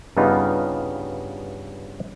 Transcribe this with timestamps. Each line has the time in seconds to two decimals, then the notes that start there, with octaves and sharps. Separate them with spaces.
0.17 G2 C#3 G3 B3 D#4 F4